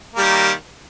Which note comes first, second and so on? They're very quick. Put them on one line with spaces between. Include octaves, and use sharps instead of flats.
A#3 G3 D#3